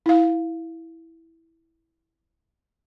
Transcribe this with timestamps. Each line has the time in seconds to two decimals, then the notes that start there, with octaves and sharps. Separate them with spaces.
0.06 E4 F5